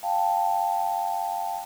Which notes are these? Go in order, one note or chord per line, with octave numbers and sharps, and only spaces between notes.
F5 G5 A5